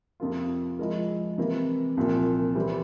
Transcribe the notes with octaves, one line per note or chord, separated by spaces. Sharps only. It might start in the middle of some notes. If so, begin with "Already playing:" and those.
F2 C3 F3 A#3 F4
F3 G#3 E4 A#4
C3 E3 A#3
C2 A#2 F3
E3 G3 C4 G4